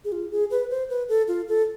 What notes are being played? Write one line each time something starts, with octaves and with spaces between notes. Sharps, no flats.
G#4
F4
G#4
B4
C5
B4
A4
F4
A4